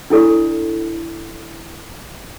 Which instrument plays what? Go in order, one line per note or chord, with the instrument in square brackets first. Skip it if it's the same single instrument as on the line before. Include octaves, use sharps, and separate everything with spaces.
[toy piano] D4 E4 A4 D5